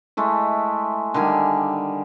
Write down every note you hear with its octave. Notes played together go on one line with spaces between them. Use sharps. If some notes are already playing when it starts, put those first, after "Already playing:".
G#3 A3 E4
D3 D#3 G3 G#5